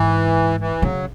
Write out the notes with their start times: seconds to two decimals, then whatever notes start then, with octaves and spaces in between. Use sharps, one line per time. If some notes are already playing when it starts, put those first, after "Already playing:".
Already playing: G#2 E3
0.60 E3
0.82 C#3 F#3